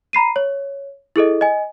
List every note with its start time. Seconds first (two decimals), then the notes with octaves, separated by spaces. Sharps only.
0.13 A#5 B5 C7 D#7
0.36 C#5
1.16 E4 G#4 A4 D#5
1.41 D#5 G#5